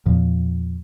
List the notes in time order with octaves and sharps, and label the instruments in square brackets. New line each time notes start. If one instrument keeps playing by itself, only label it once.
[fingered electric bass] E2 A#2 F3